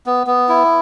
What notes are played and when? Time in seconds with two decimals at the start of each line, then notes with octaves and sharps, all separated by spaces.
0.06 B3
0.27 B3
0.49 E4